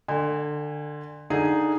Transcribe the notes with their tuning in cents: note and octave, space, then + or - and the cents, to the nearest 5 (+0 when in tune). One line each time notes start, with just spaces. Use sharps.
D3 +20 G#5 -35
D3 +10 D#4 +0 G#4 +0